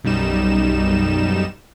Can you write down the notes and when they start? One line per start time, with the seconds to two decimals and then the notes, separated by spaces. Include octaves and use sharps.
0.04 B1 F#2 G3 D#4 E7